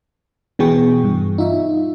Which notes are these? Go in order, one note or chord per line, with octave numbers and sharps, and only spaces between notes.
B2 E3 B3 G#4 G5 C#6
G2
D#4 F4 E5